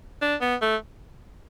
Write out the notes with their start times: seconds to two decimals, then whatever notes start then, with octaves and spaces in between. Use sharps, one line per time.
0.21 D4
0.41 B3
0.62 A3